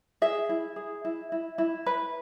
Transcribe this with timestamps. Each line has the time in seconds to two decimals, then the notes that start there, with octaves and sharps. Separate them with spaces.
0.22 G#4 E5
0.49 E4
0.76 G#4
1.05 E4
1.32 E4
1.58 E4
1.86 B4